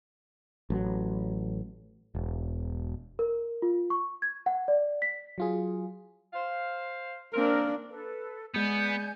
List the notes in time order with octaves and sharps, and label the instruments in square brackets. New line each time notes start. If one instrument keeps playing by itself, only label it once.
[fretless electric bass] A1 F#3
[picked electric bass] E1
[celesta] A#4
F4
C#6
G#6
F#5
D5
B6
[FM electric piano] F#3 F4 G#4
[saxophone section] C5 F5
[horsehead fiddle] A#3 D4 [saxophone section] C4 A#4
[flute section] A4 B4
[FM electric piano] G#3 C#7 [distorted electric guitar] B3 [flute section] D5 G#5 G6